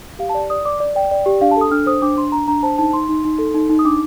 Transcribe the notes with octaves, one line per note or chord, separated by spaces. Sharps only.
G4 F5
A5
D5
D5 D#6
D5 D6
D5
D5 G5
D5
G4
D4 F5
A5
A4 D#6
D4 F6
C5 D#6
D4 D6
D4 C6
D4 A#5
D4 A#5
C5 A5
D#4 A5
D#4 C6
D#4
D#4
A4
D#4
D#4
D#6
D4 D6